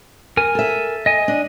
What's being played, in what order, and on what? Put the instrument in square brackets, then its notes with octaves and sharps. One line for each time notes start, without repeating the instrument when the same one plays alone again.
[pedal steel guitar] A#4 G#5
[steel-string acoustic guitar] A4 E5
[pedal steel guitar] D#5 G#5
[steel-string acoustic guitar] D4